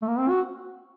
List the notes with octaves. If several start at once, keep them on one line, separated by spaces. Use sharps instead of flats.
A3
A#3
C4
F#4